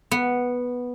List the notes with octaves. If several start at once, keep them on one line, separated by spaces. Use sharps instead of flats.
B3